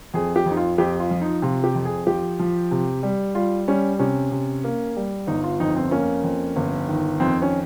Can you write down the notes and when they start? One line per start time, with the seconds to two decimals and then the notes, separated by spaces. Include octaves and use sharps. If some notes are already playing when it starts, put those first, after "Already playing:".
0.14 F2 G#4
0.36 G4
0.46 F2
0.51 D#4
0.57 F4
0.78 F2 G4
1.00 F4
1.11 F3
1.21 D#4
1.42 C3 F4
1.64 G4
1.75 F2
1.85 G#4
2.07 F3 G4
2.39 F3
2.71 C3
3.03 G3
3.35 G3 F4
3.68 G3 C#4
3.99 C3 C#4
4.31 C3
4.64 A#3
4.96 G3
5.27 G1 D#4
5.44 F4
5.60 F2 D#4
5.76 C4
5.91 A#3 C#4
6.24 F2
6.56 G1
6.88 D#3
7.20 F2 C4
7.42 C#4